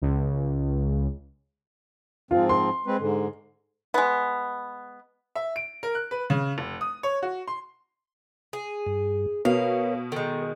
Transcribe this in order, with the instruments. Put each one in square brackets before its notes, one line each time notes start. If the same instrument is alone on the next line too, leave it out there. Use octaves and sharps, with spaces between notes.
[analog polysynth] C#2
[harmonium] G#2 F3 C4 [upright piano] F4
[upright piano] C6
[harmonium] G#3 C4 B4
G#2 D3
[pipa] G#3 B3
[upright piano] E5
D7
A#4
F#6
B4
C#3
F1
D#6
C#5
F#4
C6
[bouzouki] G#4
[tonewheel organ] G2
[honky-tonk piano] B2 [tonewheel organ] A#4 B4 C#5 [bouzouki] F5
[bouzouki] D#3 G#3 [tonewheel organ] A4